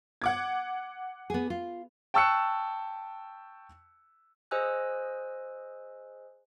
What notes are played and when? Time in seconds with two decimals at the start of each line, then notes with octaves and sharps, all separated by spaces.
0.22 F#5 D6 G#6
1.30 B3 G#4
1.50 F4
2.14 G5 A5 C#6 E6 F#6 C#7
4.51 G#4 C5 D#5 G#5 E6 F#6